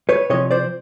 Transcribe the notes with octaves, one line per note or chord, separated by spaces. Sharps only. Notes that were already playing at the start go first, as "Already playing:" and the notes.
B4 C#5
C3 F3 C#5 D#5
C5 D5